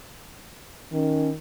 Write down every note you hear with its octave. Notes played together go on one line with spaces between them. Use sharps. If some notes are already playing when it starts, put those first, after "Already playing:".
D#3 C#4